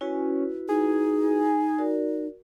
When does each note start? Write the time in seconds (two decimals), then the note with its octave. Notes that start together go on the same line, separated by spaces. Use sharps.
0.01 C#4 E4 F#4 B4
0.69 D#4 G#4
1.78 F#4 A#4 D5